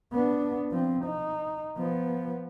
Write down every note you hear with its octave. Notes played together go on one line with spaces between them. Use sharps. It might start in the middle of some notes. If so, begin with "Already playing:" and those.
B3 D4
F3 C4
D#4
F3 B3